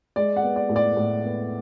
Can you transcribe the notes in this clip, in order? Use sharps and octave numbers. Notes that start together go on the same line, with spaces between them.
G#3 D5
F#5
B3
D5
A2
D5
A2
B3